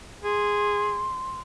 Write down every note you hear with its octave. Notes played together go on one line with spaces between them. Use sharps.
G#4 C6